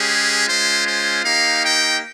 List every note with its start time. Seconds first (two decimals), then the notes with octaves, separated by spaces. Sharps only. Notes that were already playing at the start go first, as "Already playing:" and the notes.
Already playing: G#3 C#4 G4 G#4
0.48 G#3 C#4 F4 C5
0.86 C5
1.24 A#3 D#4 G4 F5
1.63 G5